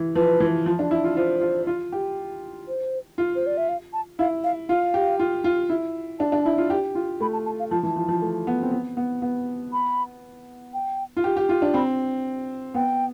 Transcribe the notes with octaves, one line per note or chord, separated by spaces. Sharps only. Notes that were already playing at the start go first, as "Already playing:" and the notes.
Already playing: E3
F3 B4
E3
F3
D4
E4
F4
F4 C5
F4
F4
G4
C5
F4
C5
D5
E5
F5
A5
E4 F5
F5
F4 F5
G4
F4
F4
E4
D4 A5
D4
E4
F4
G4
F4
A3 B5
A5
A5
F5
F3 A5
E3
F3
F3
A3
B3
C4
B3
B3
B3
B5
G5
F4
G4
G4
F4
D4
C4 B5
B3 G5